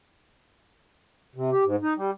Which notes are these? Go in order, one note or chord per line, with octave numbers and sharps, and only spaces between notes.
C3
G4
G#2
D#4
G3